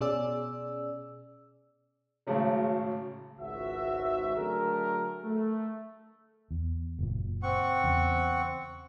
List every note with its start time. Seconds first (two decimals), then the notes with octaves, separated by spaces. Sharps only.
0.01 B2 C#4 G#4 D5 E6
2.27 G#1 A2 C#3 F#3
3.39 G#1 C#2 F#4 E5
4.36 D3 F#3 A3 G#4 A#4
5.24 A3
6.51 E2
6.99 F#1 A#2
7.43 C4 F#5 C#6
7.84 E2 C#3